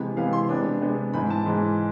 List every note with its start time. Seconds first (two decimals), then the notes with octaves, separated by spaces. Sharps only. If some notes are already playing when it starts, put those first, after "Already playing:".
Already playing: C3 E3 G#3 B3
0.16 C3 E3 G#3 B3 F5
0.33 C6
0.49 C3 G#3 B3 D4
0.81 C3 G#3 B3 D4
1.14 G#2 E3 G#3 B5
1.30 A5
1.46 G#2 E3 G#3